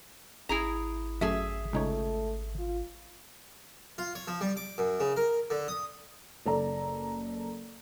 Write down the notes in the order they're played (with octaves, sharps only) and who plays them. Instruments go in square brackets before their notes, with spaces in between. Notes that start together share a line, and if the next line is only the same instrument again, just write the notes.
[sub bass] G#1 [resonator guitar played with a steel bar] E4 G#4 A#5
[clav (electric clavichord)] F#2 A3 [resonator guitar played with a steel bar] G#4 E5
[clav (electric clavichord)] C#2 D#4 C#5 [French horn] A3
[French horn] F4
[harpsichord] F4
C#5
F3
G3
D6
F#2
C#3
A#4
D3
D#6
[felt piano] F#1 A4 D5 A#5